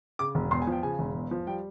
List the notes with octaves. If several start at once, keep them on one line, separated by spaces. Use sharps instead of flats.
C#3 D6
E1
E2 C6
G#5
F3 G5
C#3 G#5
E1
E2
F3
G3 G5